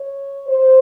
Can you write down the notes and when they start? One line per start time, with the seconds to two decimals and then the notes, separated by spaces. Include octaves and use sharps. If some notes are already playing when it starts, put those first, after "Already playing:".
Already playing: C#5
0.48 C5